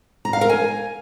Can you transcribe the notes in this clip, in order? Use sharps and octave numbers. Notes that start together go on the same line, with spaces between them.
A#5
F5
A#4
G#5